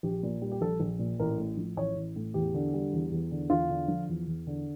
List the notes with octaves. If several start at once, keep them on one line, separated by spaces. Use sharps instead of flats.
A#1 G4
A#2
G3
G4
A#1 A4
A#1
A#2
A1 A#4
A2
F3
A1 C#5
A1
A2
E2 G4
D3
G3
E2
E2
D3
E2 F4
D3
F3
E2
E2
D3